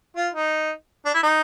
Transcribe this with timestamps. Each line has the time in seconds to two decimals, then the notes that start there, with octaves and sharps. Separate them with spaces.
0.16 F4
0.34 D#4
1.05 D4
1.14 E4
1.23 D#4